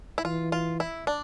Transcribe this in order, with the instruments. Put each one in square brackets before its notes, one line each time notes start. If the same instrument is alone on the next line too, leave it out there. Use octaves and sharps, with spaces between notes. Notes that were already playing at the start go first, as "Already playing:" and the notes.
[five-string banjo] E4
[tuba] E3 [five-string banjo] F4
[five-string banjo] F4
E4
D4